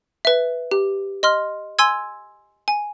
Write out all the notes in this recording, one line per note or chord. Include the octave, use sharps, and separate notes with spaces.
B4 E5
G4
D#5 C6 F6
G#5 C6 E6 G#6
G#5